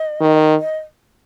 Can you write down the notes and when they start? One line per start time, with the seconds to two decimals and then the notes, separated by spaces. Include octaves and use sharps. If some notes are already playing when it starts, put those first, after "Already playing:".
Already playing: D#5
0.21 D#3
0.60 D#5